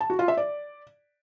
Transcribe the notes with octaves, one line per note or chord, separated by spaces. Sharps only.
A5
F#4
F4
E5
D5